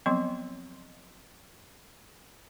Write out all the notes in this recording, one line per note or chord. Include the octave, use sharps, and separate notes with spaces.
F3 F#3 B3 C4 C6